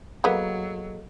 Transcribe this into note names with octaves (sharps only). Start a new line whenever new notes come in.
F#3 A#3 B3 G#4 A4 D#5